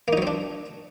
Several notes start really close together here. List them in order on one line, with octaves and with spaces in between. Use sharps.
A#3 D#4 F#3 C4 D4